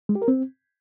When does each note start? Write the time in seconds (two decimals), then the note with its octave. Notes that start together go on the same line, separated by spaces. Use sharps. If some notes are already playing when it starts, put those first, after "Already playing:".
0.09 G#3
0.15 G4
0.22 A#4
0.28 C4